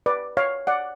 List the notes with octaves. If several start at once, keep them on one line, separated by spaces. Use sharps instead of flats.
B4 D5
C#5 F5
D5 F#5